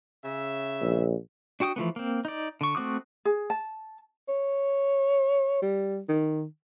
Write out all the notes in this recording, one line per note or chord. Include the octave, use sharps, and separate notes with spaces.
C#3 E5
A#1
D4 F#4 G5 D6 D#6
E3 F3 A3 B3
A#3 C4
D#4 D5
D3 C#6
A3 C4 F#4 D6 D#6
G#4
A5
C#5
G3
D#3